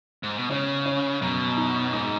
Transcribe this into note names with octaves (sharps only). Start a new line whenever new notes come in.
G#2
B2
C#3 C#4
C#4
F#2 B2
D#4
G#2 D#4